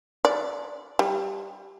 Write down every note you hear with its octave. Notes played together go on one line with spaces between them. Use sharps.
D5
G3